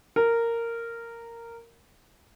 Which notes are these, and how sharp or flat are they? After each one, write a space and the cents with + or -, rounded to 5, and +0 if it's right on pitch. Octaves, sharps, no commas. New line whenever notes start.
A#4 -10